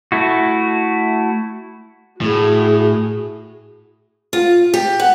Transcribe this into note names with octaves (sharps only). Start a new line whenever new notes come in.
A3 E4 F#4
A2 F#4 G#4
F4
G4
F#5